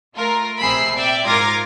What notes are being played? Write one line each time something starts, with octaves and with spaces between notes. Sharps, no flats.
A3 F4 A#4
A#1 C3 G#4 B5 E6 C7
D5 E5 G5
G#2 F4 A#4 D6 G#6 A#6